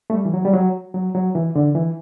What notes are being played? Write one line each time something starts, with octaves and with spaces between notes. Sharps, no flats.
A3
G3
E3
F#3
G3
F#3
F#3
F#3
E3
D3
E3